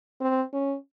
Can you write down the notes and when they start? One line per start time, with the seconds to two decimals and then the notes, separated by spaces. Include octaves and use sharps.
0.21 C4
0.53 C#4